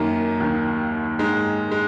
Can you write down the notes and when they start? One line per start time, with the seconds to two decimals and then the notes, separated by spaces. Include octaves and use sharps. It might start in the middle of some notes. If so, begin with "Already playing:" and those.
Already playing: F#2 D#3 A#3
0.40 D#2 D#3
1.19 G#2 D#3 G#3
1.71 G#3